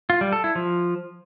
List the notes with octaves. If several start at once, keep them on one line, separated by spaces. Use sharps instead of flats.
F4
G3
A4
E4
F3